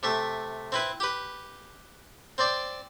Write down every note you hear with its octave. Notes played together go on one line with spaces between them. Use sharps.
C3 A3 E5
C4 E4 B4
G4 B4
C4 C5 D5